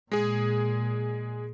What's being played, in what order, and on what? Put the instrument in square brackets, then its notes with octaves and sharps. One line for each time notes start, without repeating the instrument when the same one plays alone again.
[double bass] A#2 [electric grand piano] G#3 G#4